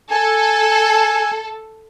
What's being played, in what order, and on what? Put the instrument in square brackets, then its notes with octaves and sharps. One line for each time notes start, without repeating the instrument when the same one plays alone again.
[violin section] A4 [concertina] G#5